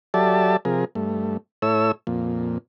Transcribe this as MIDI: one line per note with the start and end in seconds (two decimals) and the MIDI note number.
0.14 0.57 54
0.14 0.57 67
0.14 0.57 69
0.14 0.57 74
0.14 0.57 76
0.14 0.57 81
0.65 0.85 48
0.65 0.85 53
0.65 0.85 68
0.65 0.85 70
0.95 1.37 43
0.95 1.37 57
1.62 1.92 45
1.62 1.92 64
1.62 1.92 69
1.62 1.92 73
1.62 1.92 88
2.07 2.58 41
2.07 2.58 46